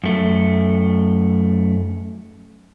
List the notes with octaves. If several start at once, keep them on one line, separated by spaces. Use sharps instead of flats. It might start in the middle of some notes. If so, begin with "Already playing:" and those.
F#2 A3